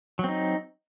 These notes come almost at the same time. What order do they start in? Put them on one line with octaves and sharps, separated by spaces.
F#3 C4 D#4